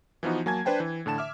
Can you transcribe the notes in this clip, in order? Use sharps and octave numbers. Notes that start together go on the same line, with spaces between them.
E3 F3 B3 D#4 F#4
F#3 A#3 G#5 A5 G#6
D4 B4 C5 G5 A5
E3
A2 D3 A5 E7
E5 D6 F6